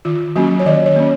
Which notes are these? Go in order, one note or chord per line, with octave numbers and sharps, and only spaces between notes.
D#3 F4
F#3 A#3 C#4 F#4
C#5
D#3 D#5
C#5
A#3 C#4